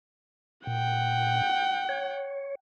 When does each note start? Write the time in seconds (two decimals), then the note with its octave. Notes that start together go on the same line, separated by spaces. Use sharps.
0.67 A#2 F#5 G5
1.89 C#5